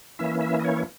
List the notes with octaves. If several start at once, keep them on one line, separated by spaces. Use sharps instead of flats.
E3 A#3 C#4 E4 E5
E5
D#5
C#5